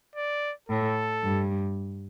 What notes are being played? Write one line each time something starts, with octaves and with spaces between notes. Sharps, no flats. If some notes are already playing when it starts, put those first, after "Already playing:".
D5
A2 A4
G2